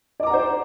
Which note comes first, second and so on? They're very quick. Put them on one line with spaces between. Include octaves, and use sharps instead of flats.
D5 D6 A#5 F#5 C5